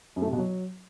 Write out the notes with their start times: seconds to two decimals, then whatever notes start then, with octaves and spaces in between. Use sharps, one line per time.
0.16 F#2
0.22 A3
0.27 C3
0.33 B2
0.38 F#3